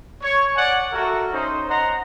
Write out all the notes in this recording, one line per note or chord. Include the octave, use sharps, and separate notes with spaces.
C#5
D5 F#5 G#5
F#4 A4 A#4 E5
C#4 D#4 C5
D#5 F#5 A#5 C6